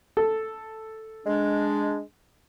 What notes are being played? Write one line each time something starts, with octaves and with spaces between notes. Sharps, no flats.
A4
G#3 D4